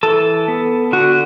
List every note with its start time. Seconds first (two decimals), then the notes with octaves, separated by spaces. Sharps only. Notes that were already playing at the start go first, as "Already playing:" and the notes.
0.03 E3 A4
0.48 B3
0.92 D3 F#4